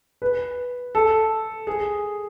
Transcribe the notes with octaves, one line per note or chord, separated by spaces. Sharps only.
B4
A4
G#4